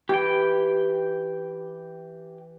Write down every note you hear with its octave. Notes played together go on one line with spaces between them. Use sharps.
E3 G4 G5